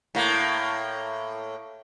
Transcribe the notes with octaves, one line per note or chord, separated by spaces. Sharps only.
A2 A#3